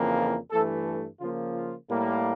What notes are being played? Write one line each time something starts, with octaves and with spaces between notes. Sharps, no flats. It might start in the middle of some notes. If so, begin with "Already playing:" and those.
Already playing: F2 C#3 E3 A#3
F4
G2 E3 A3 A4
A4
C#3 F3 A#3 F4
F4
A2 G3 A#3